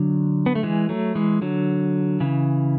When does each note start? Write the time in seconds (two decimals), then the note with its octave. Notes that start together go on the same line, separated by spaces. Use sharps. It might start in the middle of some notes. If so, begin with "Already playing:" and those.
Already playing: D3 F#3
0.46 B3
0.55 A3
0.63 E3 G#3
0.89 F#3 A3
1.15 E3 G#3
1.42 D3 F#3
2.20 C#3 E3